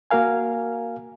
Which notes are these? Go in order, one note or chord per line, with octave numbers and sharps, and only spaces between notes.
A#3 F#4 A#4 F5 G#5